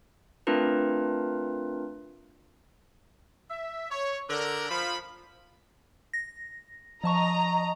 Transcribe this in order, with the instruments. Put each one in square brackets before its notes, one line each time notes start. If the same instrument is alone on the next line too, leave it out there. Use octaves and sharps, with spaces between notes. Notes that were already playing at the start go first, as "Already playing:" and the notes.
[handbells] A3 C4 D4 F4 A#4 B4
[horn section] E5
C#5
D3 A#4
F3 B5
[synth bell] A#6
[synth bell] F3 A5 C#6 [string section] D#5 A#5